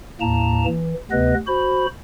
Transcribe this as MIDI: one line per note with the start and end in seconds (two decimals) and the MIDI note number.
0.21 0.66 39
0.21 0.66 45
0.21 0.66 58
0.21 0.66 81
0.21 0.66 82
0.66 0.94 52
1.11 1.34 38
1.11 1.34 48
1.11 1.34 59
1.11 1.34 71
1.11 1.34 75
1.47 1.87 66
1.47 1.87 72
1.47 1.87 83